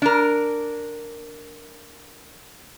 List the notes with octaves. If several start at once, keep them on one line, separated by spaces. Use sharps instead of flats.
D4 A#4